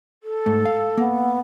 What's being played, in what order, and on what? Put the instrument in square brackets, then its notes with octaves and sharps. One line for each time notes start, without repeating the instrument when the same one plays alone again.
[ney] A4
[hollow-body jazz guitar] G#2 A3
F5
[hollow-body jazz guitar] A#3 [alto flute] B3